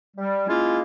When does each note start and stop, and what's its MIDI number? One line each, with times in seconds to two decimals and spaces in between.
0.16 0.45 55
0.48 0.80 56
0.48 0.80 58
0.48 0.80 61
0.48 0.80 64
0.48 0.80 65